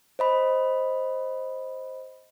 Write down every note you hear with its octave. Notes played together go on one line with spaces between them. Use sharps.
C5 D#5 B5